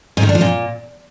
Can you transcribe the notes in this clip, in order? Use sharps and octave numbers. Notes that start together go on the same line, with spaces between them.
G#2
D#3
D4
F3
A#2